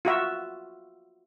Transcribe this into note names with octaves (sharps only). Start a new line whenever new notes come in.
F4 F#4 E5